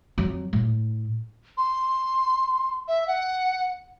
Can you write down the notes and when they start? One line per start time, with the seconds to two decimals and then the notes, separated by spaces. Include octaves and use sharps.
0.18 F2 F#3
0.53 A2
1.57 C6
2.88 E5
3.07 F#5